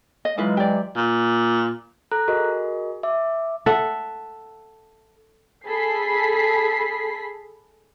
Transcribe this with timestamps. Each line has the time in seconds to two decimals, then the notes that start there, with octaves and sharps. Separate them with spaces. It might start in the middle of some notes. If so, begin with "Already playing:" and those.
0.25 D#5
0.38 E3 F#3 G#3 D#4 F4 B4
0.57 G4 D5
0.96 A#2
2.11 A4 A#5 F#6
2.28 F#4 G#4 A#4 D#5
3.03 E5 D6
3.66 A4 E5 F#5
5.68 G#4 A4 B5 B6 C7